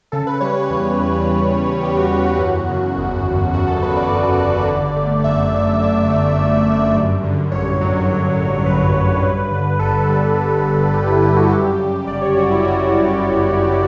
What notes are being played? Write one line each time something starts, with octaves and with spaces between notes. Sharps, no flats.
C#3 A4
B4
G3 C#5
C#5
E2 B4
E2
C#3
G3
E2 G4
F#4
E2 F#4
F#4
F#2
C#3
G1
G1
F#2 F#4
A4
C#3 B4
D5
G1
G1
D3
A3
F#2 E5
F#2
D3 D5
A3
F#2
F#2
G2
D3
A1 C#5
F#3
G2
D3
A1 B4
F#3
G2
D3
G1 A4
G3
G2
D3
G1 G4
E4
G3 E4
F#4
F#2 G4
C#3
G1 D5
C#5
G1 F#4
E4
F#2 F#4
C#3
G1
G1